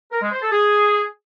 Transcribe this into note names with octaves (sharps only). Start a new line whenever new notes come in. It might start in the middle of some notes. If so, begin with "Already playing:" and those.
A#4
G#3
C5
A4
G#4